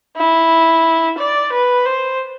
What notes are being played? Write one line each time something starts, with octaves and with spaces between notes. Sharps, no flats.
E4
D5
B4
C5